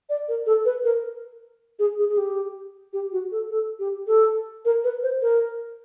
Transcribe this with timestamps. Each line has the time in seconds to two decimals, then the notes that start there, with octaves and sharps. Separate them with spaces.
0.10 D5
0.28 A#4
0.46 A4
0.65 B4
0.84 A#4
1.79 G#4
1.99 G#4
2.09 G#4
2.18 G4
2.93 G4
3.12 F#4
3.32 A4
3.50 A4
3.79 G4
4.07 A4
4.65 A#4
4.84 B4
5.03 C5
5.22 A#4